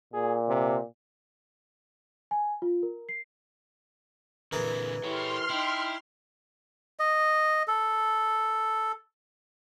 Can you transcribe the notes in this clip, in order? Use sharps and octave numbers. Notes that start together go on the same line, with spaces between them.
A#2 G#4
C3
G#5
F4
A#4
C7
A#2 D3 E3 G#4 A#4
E4 G4 A4 C#5 C6 F6
D#4 E4 G5
D#5
A4